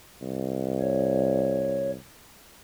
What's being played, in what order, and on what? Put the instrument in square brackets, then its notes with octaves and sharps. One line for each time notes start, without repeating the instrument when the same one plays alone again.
[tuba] C2
[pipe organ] C#5